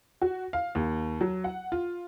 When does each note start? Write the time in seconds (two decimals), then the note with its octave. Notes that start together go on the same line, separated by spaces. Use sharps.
0.22 F#4
0.53 F5
0.75 D#2
1.21 F#3
1.44 F#5
1.72 F4